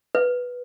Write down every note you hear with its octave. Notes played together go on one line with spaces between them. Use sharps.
B4